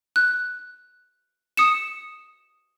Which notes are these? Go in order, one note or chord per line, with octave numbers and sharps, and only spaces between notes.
F#6
D#6 C#7 E7